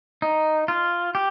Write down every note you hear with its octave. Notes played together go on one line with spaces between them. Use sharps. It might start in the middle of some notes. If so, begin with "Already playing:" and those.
D#4
F4
G4